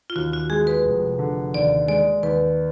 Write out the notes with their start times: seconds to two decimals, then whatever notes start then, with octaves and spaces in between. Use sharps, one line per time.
0.10 F4
0.16 D#2 F#4
0.33 F#4
0.50 G#3 G#4
0.67 B4
0.85 F1
1.19 D3
1.54 D#2 D5
1.88 G#3 D5
2.23 D#2 B4